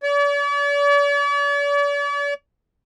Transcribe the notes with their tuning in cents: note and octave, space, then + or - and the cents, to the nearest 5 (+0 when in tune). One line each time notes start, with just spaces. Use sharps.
D5 -45